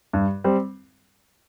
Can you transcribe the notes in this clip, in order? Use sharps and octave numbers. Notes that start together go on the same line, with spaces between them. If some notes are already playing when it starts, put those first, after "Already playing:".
G2
G3 C4